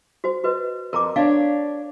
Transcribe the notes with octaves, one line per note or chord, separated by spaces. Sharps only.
F#4 C5
F#4 B4 D#5
F2 A#4 A#5 D6
D4 C#5 D5 F5